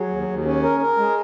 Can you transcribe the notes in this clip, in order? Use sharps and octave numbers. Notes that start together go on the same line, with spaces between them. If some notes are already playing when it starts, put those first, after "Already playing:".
Already playing: F#3 G#4
D#2
D#2
C#4
A#4
A#4
G#3